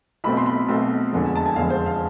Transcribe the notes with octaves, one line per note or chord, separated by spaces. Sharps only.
B1 B2 A3 C4 B5
C6
B5
B1 B2 A3 C4
F1 E2 D3 F3 G#3
A5
G#5
F1 E2 D3 F3 G#3 F5
C5
F5